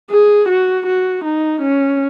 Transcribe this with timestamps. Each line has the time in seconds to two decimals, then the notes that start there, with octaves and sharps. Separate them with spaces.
0.11 G#4
0.48 F#4
0.86 F#4
1.24 D#4
1.61 C#4